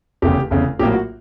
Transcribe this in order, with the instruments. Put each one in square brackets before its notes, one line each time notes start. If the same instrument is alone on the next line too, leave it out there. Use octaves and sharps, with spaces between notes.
[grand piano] F1 E2 C#3 G4
F1 E2 C#3
A#1 A2 F#3 A#3 G4
F#4